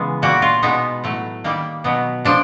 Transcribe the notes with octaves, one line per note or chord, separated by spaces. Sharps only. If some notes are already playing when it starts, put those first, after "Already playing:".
Already playing: C#3 E3 G#3 B3
A#2 G3 A#3 F#4
F4
B2 G#3 B3 D#4
A2 F#3 A3
D#3 G3 A#3
B2 F#3 B3
A#2 F3 D4